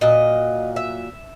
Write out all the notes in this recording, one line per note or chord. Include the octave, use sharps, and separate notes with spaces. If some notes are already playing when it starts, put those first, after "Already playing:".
A#2 F#3 D#5
E5